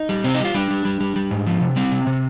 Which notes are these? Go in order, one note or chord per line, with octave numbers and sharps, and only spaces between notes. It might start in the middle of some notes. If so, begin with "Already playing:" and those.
Already playing: D#4
G3
C3 C4
D#4
G3 F4
G3 D4
G3
G3
G3
G3
G#2
F3
C3
G3 C4
C3
C3